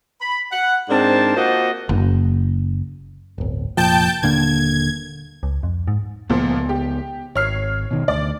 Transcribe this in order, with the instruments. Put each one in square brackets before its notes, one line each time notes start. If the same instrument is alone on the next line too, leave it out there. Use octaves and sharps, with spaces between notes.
[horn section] B5
F#5
G#2 C4 D4 A#4 C5 A5
A#3 F4 F#4 C5 D#5 F#5
[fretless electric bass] F#1
[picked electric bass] D1 G1
[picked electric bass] F1 A#2 F3 [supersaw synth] G5 A5 G6
[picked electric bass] D#1 D3 A#3 [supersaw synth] G#6
[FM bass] C#2
F2
G#2
[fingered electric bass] C#2 B3 [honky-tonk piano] A#2 F3
[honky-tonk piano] G4
[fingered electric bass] G#1 [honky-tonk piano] C#5 F6 C7
[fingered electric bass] B2 D#3
[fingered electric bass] D2 [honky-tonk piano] D5